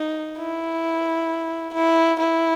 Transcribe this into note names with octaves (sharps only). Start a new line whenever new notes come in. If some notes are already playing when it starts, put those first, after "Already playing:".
Already playing: D#4
E4
E4
E4